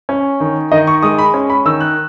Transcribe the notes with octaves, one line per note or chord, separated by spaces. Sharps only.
C#4
D#3
D#3 D#5
C#6
G#3 D#6
B5
C#4
B5
D#3 E6
F#6